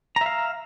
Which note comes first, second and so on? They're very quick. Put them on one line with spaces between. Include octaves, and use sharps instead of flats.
A#5 E5 F5